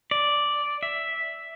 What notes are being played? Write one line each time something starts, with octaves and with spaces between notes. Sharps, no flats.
D5
E5